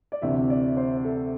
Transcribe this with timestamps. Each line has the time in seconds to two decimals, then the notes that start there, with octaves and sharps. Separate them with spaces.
0.12 D5
0.22 D2 C3 E3 E5
0.50 D5
0.77 C5
1.05 A4